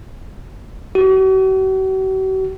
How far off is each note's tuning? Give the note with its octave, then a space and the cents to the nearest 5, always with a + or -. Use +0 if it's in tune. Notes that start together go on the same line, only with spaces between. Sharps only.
F#4 +45